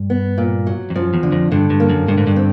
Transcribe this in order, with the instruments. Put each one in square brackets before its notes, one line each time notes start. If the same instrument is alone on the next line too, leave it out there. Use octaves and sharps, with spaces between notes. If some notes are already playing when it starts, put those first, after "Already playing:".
Already playing: [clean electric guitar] G2
[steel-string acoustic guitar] B3
A#2
F#3
[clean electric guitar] F2
[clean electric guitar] F#2 [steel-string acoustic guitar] F3
[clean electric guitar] E2
[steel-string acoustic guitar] D3
[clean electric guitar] F2
[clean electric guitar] G2 [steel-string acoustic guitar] D3
[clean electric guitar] G2
[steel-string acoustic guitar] A#3
[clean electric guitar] F#2
[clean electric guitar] G2 [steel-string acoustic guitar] D3
[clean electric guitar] G#2
G2
[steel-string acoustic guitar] C4